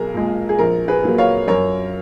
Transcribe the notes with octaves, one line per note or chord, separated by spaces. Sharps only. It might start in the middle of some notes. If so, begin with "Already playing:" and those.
Already playing: B1 G#4 A#4
A#2 G#3
G#4
A#1 A#4
G#4 B4
A#2 F#3 A#3
C#5 F5
F#2 A#4 C#5